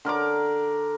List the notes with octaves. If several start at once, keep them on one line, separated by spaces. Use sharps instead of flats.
D3 A#4 D5 D6